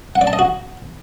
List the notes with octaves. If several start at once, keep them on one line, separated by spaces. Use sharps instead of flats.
F#5
D5
A5
D#5
F#4